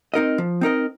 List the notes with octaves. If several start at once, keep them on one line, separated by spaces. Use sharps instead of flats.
C4 D#4 A#4 D#5
F3
C4 D#4 A#4 D#5